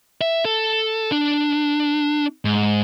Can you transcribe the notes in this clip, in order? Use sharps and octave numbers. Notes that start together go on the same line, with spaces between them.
E5
A4
D4
G#2